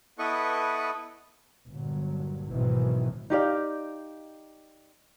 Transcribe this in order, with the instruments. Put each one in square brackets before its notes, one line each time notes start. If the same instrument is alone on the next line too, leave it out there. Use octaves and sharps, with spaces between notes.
[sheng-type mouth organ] B3 E4 A4 B4 D#5 C#6
[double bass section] G1 A#2 F#3
G#1 B2 D#3 E3 F#3 C4
[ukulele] D#4 G4 D5 F5